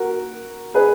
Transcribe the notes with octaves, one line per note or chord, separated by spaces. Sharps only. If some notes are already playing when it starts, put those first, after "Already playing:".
Already playing: F#4 A#4
G#4 B4